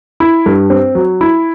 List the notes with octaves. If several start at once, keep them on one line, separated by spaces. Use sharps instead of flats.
E4
G2
C4
F#3
E4